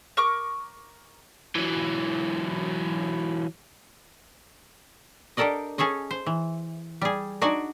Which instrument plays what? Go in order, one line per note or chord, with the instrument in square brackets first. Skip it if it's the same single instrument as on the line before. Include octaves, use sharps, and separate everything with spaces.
[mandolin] A#4 C#6 D6
[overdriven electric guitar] E3 F#3
[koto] D4 G4 A4 A#4 D5 D#5
C#4 G#4 A4 C#5 D#5
C5
E3
G3 G#4
D4 D#4 F#4 D5 F#5 G#5